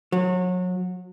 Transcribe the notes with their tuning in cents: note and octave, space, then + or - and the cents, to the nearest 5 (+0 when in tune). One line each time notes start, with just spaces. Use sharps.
F#3 -30